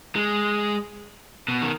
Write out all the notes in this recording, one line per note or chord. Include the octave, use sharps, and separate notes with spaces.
G#3
B2
D#3